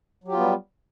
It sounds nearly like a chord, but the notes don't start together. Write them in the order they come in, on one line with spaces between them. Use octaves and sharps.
F#3 G4 F4 B3 G3